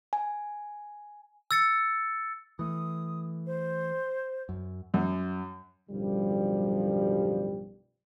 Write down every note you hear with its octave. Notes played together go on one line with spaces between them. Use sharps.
G#5
E6 A6 C#7
E3 A3 D#6
C5
F#2
F#2
B1 F#2 A2 D3 F3 G3